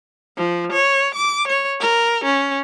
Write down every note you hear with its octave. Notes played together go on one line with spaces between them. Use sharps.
F3
C#5
D6
C#5
A#4
C#4